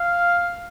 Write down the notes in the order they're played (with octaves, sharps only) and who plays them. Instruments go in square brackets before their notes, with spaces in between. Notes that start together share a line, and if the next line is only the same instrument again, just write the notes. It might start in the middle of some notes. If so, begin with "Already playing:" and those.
Already playing: [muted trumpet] F5